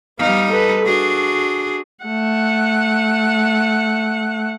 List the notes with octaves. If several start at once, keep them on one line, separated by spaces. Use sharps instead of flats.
G3 B3 D#4 F5
A4 B4
D4 F#4 G#4
A3 F#5